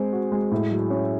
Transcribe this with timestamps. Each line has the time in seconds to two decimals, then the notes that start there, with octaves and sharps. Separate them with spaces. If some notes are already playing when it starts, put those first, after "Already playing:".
Already playing: G#3 C4
0.13 F#4
0.32 G#3
0.51 A2
0.71 F#3
0.90 C#4